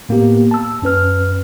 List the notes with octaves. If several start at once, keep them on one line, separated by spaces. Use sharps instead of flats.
A2 A#3 B3 G4
A5 E6
F#2 C#4 B4 F6